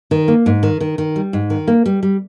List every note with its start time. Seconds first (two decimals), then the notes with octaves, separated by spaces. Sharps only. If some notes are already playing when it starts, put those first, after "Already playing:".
0.11 D#3
0.28 A#3
0.46 G#2
0.63 D#3
0.80 D#3
0.98 D#3
1.16 G3
1.33 G#2
1.50 D#3
1.67 A#3
1.86 G3
2.03 G3